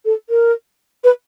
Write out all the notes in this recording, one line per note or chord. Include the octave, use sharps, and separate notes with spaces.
A4
A#4
B4